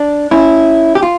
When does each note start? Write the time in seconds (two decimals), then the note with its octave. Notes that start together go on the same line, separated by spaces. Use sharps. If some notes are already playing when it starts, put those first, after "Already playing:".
Already playing: D4
0.31 C#4 E4
0.95 G4
1.03 F4